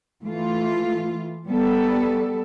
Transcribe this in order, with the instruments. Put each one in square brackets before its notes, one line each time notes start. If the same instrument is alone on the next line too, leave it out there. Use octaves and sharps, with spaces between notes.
[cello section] E3 A3 F4
G3 B3 A4